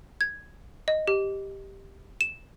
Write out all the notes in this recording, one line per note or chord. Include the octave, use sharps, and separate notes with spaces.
G#6
D#5
G4
E7